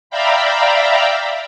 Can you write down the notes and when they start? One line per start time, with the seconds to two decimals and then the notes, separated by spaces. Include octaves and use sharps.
0.10 D5 E5 F5 G5 A#5 B5